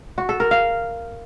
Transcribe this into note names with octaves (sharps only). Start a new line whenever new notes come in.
F#4
A4
A#4
F5